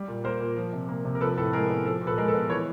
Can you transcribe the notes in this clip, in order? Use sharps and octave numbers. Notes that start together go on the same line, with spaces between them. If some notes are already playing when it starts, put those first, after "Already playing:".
Already playing: G3
A#2
A#3 A#4 C5
A#2
F3
C3
A#3
C3
A#4
F3 A4 B4
A2 A4 B4
G#3 G#4 A#4
B3
F3 A4
A#2
A4 B4
G#3 A#4
A4 B4
B3
E3 B4 C#5